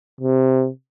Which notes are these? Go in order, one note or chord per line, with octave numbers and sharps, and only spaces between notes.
C3